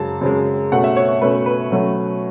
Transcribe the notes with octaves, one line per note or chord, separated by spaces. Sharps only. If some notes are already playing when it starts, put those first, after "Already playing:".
Already playing: F#2 C#3 G#3 A5
F#2 C#3 G#3
B2 A3 C#4 F#5
E5
C#5
C#5
B2 A3 C#4 B4
B4
B2 F#3 A3 C#4